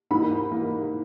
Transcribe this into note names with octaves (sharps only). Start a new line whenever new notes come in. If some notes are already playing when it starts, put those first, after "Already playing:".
G#2 E3 A#3 B5
E3 A#3